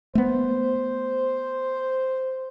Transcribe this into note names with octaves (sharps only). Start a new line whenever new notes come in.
A3 B3 C5